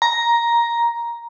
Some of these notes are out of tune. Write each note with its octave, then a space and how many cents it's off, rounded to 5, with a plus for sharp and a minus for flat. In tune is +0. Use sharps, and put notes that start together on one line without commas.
A#5 +10